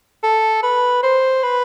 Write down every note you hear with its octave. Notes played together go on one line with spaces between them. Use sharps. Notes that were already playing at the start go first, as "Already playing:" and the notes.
A4
B4
C5
B4